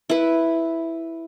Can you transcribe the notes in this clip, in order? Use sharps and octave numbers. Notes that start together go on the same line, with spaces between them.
E4 B4